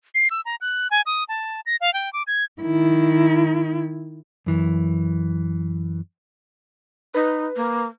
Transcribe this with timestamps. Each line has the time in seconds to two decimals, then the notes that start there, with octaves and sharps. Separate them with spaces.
0.15 C7
0.31 E6
0.46 A#5
0.61 F#6
0.91 G#5
1.06 D#6
1.29 A5
1.66 A#6
1.81 F5
1.94 G5
2.13 D6
2.27 G#6
2.62 D#3 E4
4.46 F#2 E3
7.14 D#4 B4
7.56 A#3